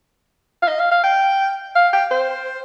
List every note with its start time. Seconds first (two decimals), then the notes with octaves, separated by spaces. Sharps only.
0.62 F5
0.68 D#5
0.79 F5
0.92 F5
1.03 G5
1.75 F5
1.93 G5
2.11 C5